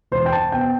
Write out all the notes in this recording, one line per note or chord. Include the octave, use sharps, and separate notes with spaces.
E1 C5
G5
A5
B2 G5